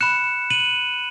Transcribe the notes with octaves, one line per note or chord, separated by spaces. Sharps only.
B5 F#6 C#7 E7
D#7 F#7